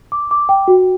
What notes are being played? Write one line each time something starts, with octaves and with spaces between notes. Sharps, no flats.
D6
D6
G5
F#4